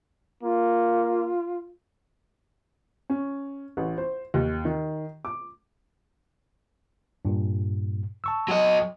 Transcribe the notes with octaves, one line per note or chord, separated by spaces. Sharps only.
A#3 F4
C#4
A1
C5
D#2
D#3
D6
G2 A#2
A5 C#6 E6
F#3 D#5